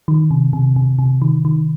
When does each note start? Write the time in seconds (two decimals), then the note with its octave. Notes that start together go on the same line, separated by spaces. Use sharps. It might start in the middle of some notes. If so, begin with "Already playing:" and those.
0.08 D#3
0.31 C3
0.53 C3
0.76 C3
0.99 C3
1.22 D#3
1.45 D#3